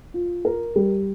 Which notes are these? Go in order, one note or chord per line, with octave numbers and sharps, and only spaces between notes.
F4
A#4
G3